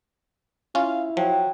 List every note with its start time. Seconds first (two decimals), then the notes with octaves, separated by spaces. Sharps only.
0.75 C#4 E4 F4 F5
1.17 F3 F#3 G5